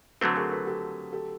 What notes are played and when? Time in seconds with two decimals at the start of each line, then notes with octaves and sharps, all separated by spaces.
0.21 D3 F#3 A3 C4 A4 B4
0.36 G#4 A#4
0.51 A4 B4
0.67 G4 A4
1.13 G4 A4